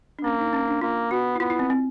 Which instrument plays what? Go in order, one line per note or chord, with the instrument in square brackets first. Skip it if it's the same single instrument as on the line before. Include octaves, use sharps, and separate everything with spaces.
[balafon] D4
[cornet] A#3 [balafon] C#4
[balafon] D#4
C#4
D4
[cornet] A#3 [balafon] F4
[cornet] B3 [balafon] F#4
[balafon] E4
[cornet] B3 [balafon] F4
[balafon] E4
C4
C4